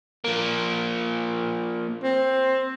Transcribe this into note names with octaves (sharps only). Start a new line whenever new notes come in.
F3 A#3
C4